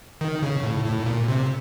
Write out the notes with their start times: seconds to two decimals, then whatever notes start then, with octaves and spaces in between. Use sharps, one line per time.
0.21 D#3
0.42 C#3
0.63 A2
0.85 A2
1.06 A#2
1.28 C3